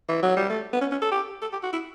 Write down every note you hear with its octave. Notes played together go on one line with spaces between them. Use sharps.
E3
F#3
G3
A3
B3
C#4
C#4
A4
G4
A4
G4
F#4
E4